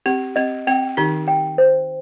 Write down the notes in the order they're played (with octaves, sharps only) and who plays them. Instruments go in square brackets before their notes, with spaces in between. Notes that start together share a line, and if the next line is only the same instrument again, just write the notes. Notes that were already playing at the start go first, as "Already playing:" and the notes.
[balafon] C4 [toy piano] G4
[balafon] C4 [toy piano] D#5
[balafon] C4 [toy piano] G5
[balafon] D#3 D#4 [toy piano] G4
[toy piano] G5
C5